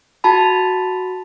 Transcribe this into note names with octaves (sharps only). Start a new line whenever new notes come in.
F#4 A5 B5